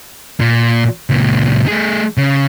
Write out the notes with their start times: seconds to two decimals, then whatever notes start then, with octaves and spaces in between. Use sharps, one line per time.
0.40 A#2
1.09 C#2 A#2
1.68 A3 G#4
2.17 C#3